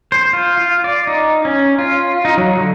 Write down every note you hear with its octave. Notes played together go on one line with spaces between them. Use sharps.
C5
F4
F4
D5
D#4
C#4
F4
D#4
F#3
D3